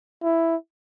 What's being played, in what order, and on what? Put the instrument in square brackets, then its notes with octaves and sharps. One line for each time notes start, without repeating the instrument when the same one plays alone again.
[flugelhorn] E4